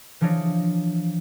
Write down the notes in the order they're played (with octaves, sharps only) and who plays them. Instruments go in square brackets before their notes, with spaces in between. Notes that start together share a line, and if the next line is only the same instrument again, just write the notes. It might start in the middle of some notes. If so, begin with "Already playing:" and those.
[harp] E3 F3 D4 F4 C#5 D#5